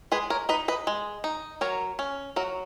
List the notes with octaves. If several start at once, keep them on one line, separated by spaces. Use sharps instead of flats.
G#3 G#4 B4
A#4 C#5
D#4 B4 D#5
B4 D#5
G#3
D#4
F#3 A#4 C#5
C#4
F#3 F#4 A#4